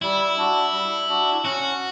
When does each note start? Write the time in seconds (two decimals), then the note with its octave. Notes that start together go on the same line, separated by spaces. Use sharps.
0.02 G3 E4
0.37 D4 F#4
0.73 G3
1.09 D4 F#4
1.44 C#4 F#4